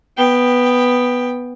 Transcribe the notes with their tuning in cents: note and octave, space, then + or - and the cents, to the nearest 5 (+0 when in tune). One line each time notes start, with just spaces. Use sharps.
B3 +0 G5 +10